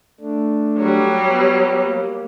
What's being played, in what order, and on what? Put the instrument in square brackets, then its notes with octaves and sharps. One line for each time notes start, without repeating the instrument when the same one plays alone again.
[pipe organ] A3 D4
[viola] F#3 G3
[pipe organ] B3
A#3